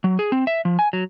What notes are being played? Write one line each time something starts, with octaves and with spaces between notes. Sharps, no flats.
F#3
G#4
C4
E5
F3
G#5
F#3